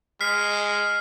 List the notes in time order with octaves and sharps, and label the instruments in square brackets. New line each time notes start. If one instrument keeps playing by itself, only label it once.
[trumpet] G#3 [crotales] F6 B6 C7